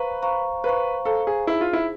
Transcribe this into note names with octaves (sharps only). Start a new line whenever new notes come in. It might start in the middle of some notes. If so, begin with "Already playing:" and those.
Already playing: B4 C5 F5 A#5 C#6
C5 F5 A#5 C#6
B4 C5 F5 A#5 C#6
A4 C5 F5 A#5 C#6
G#4
D#4 E4 G#4 C5
F4
E4